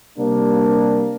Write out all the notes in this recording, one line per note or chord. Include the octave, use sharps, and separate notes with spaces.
C3 G3 A#3 D4